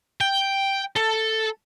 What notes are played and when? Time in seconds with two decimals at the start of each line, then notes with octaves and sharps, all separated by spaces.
0.21 G5
0.96 A4